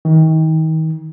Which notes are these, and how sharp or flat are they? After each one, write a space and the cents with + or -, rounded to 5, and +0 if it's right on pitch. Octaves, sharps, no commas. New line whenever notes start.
D#3 +35